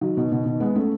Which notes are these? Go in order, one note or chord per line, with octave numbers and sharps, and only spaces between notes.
D#3 F#3
B2 D#3
B2 D#3
B2 D#3
G#3 B3
A3 C#4